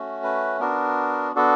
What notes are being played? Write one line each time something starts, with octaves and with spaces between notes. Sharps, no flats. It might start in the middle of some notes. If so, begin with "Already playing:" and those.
Already playing: A3 C#4 F#4
B4
B3 D4 F#4 A#4
B3 D4 F#4 A4